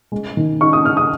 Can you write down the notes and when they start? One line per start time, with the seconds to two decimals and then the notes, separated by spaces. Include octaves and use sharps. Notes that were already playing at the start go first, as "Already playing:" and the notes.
0.12 G#3
0.37 D#3
0.61 D#4 C#6
0.73 D#6
0.84 D#4 F6
0.97 D#6